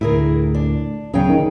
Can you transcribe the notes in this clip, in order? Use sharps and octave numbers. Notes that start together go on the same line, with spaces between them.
D2 A2 E4 G#4 A#4
D4
D#1 C#3 F#3 B3 G#4 C#5 G5
D#3